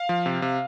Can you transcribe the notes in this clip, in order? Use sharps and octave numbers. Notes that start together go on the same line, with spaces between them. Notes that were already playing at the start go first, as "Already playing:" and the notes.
Already playing: F5
F3
C3
C3